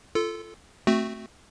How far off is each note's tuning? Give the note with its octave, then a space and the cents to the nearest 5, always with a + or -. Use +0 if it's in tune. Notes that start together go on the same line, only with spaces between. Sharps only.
F4 -20 A4 +0
A3 +0 C4 +0 F#4 +0